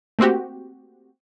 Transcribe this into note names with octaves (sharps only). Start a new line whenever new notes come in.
A3 A#3 C4 F#4 G4